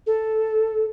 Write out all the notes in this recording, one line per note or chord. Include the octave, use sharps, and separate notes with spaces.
A4